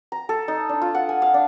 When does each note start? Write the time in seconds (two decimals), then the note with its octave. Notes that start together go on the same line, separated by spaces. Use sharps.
0.12 A#5
0.29 A4
0.48 D#4
0.69 D4
0.82 F4
0.95 F#5
1.09 G#5
1.22 F5
1.34 D4